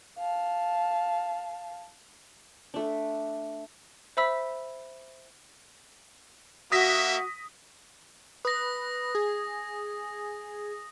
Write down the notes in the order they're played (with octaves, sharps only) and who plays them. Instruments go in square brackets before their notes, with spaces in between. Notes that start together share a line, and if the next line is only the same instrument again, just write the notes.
[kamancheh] F5 A5
[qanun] A3 D4
[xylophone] C5 E5 B5 E6 B6
[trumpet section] A#3 E5 [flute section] F#4 [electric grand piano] D#6 A#6 B6
[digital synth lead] B4 [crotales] D#6 A#6
[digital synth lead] G#4